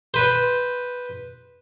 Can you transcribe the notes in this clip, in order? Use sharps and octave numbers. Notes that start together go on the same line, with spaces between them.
B4 C5